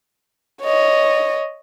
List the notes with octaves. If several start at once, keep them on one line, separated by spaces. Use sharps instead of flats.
C#5 D#5